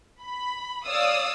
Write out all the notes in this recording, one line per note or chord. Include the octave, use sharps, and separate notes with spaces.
B5
C#5 D5 F5 D#6 E6